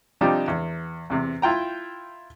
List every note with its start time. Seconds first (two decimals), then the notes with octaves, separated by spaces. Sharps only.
0.21 C3 F3 G3 D4 D#4 G4
0.48 E2
1.10 E2 C3
1.42 E4 F4 G5 A#5